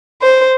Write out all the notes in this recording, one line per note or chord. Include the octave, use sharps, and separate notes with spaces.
C5